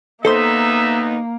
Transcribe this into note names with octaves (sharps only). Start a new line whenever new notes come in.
D#2 A#3 B3 D#4 A4 C5 E5 C6